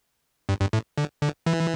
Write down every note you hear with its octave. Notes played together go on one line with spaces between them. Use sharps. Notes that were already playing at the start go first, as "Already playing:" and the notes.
G2
G2
A2
D3
D3
E3